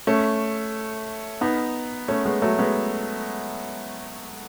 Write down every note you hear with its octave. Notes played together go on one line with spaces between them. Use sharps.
A3 C#4
B3 D#4
A3 C#4
G#3 B3
F#3 A3
G#3 B3